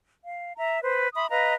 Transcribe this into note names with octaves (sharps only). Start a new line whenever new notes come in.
F5
E5 A#5
B4 C5
E5 B5 C6 D#6
B4 D#5 F5 A#5